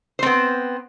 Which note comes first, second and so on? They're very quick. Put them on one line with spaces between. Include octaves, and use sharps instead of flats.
C5 C4 B3